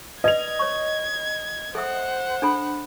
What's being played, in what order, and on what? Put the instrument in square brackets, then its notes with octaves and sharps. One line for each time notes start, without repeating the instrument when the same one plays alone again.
[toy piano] B4 D5 [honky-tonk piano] D#5 F7 [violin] G#6
[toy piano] C#5 C#6
[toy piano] A4 E5 D#6 [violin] C5 F#5
[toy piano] D4 A4 B5